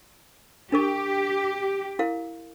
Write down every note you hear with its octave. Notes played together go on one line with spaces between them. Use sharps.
D4 G4 A#4 C#6
E4 A#4 F5